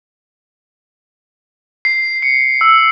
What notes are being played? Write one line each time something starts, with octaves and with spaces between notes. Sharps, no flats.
C7
C#7
E6